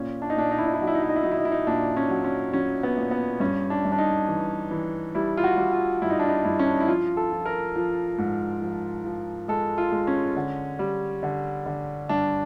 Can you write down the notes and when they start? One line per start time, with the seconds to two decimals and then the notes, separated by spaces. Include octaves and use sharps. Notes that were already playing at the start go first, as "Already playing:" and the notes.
Already playing: A#2 C#4
0.22 D4
0.30 D#4
0.37 A#2 D4
0.51 D#4
0.58 E4
0.66 D#4
0.73 E4
0.80 F#3 D#4
0.87 E4
0.95 D#4
1.02 E4
1.09 D#4
1.16 E4
1.23 F#3 D#4
1.31 E4
1.38 D#4
1.45 E4
1.52 D#4
1.67 A#2 D4
1.97 C#4
2.10 F#3
2.24 C#4
2.53 F#3 C#4
2.83 B3
2.97 A#2
3.11 B3
3.40 G2 C#4
3.70 D4
3.85 G2
3.92 D4
3.98 D#4
4.28 E3
4.71 E3
5.15 G3 E4
5.37 F4
5.44 F#4
5.57 G3
5.73 F4
6.02 G2 E4
6.10 D#4
6.19 D4
6.28 D#4
6.44 G2 E4
6.59 C#4
6.66 D4
6.74 D#4
6.80 E4
6.88 F3 F4
7.17 A4
7.32 F3
7.46 A#4
7.76 F3
8.18 G#2
8.62 F3
9.05 F3
9.48 G#3 A4
9.78 F4
9.92 G#3
10.07 C#4
10.36 D3
10.79 G3
11.23 D3
11.66 D3
12.09 G2 D4